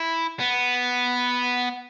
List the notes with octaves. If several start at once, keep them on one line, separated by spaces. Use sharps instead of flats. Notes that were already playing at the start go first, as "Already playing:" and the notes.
Already playing: E4
B3